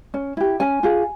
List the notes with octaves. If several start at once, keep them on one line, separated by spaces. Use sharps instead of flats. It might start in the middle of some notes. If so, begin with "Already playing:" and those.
C#4
E4 G4
C#4 G#5
F4 G#4